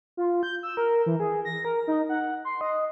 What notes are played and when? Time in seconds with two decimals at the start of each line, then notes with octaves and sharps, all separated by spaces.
0.17 F4
0.43 G6
0.63 E6
0.77 A#4
1.06 E3
1.20 G#4
1.45 A#6
1.65 A#4
1.87 D#4
2.09 F#5
2.45 C6
2.61 D#5